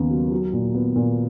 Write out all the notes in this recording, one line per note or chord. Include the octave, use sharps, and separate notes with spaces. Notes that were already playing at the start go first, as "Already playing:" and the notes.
Already playing: D#2 C#3 B3
F#3
F#3
A#2
B3
A#2